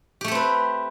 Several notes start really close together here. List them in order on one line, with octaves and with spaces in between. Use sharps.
G4 A3 A4 C4 B4